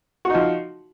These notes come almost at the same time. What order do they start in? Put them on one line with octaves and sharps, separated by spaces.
F#4 D#4 F3